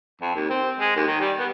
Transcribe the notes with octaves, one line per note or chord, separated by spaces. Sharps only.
F2
D#2
C4
G#3
D#2
D#3
G3
B3